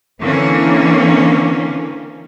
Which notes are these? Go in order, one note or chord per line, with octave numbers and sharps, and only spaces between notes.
D3 E3 A#3 C4 C#4